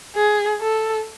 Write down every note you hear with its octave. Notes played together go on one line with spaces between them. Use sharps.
G#4
A4